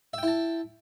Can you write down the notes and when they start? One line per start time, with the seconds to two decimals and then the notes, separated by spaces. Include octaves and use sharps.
0.13 E5
0.18 G5
0.23 E4
0.27 A5